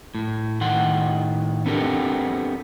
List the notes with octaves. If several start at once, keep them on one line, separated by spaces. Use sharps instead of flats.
A2
A2 D#3 F#5 C6
B3 C4 D4 G4 A4 A#4